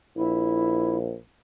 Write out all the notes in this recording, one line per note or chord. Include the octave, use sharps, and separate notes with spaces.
A#1 E4